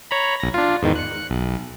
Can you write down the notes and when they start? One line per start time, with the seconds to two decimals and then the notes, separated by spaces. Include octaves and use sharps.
0.11 C#5 A#5 B5
0.40 B1 A#6
0.54 D4 F4
0.83 E2 G#2 D#3
0.95 F#6 C#7
1.30 B1